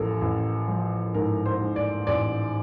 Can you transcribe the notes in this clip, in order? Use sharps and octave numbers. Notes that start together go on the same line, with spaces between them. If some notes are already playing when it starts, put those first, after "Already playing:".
Already playing: A1 F3 A4 A#4
A1
F3
G#2 A#4
C5
G#2
D5
A1 D5